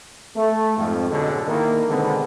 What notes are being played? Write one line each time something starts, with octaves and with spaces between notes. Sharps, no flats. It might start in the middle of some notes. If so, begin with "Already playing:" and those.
A3
F2 G#2
B2 D3 F#3 G#3
D#3 A#3 D#4 E4 A#4
B2 D3 D#3 G#3 B3 C4